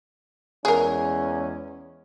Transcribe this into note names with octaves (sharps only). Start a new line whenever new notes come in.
E2 G#3 C#4 G#4 A#4